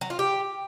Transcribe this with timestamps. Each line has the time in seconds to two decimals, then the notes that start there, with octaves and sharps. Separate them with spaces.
0.01 F#3
0.10 F4
0.19 G4